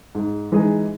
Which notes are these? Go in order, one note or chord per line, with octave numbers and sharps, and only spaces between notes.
G#2
E3 G#3 D#4 G#4